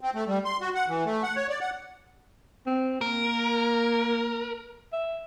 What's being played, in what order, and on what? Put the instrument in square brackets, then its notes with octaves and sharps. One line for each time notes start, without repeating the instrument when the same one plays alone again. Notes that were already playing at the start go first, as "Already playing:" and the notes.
[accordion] C4
A3
G3
C6
F#4
F#5
E3
A3
F#5
C#5
D5
F#5
[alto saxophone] C4
[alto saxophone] A#3 [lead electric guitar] A#4
[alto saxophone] E5